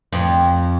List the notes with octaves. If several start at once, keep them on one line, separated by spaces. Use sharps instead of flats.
F2